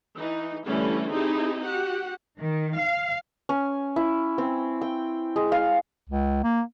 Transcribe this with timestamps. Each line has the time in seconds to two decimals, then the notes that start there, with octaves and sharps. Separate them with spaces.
0.17 E3 D#4
0.66 D3 E3 G3 A3 C#4 E4
1.11 C4 D#4 E4 G4 G#4
1.64 F#4 G4 F#5
2.39 D#3
2.76 F5
3.49 C#4
3.96 E4
4.38 C4
4.81 G5
5.36 G#3
5.52 F5
6.09 C#2
6.43 A#3